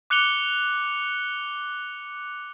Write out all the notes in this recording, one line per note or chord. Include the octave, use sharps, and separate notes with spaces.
D6 F#6 C#7 F7 G7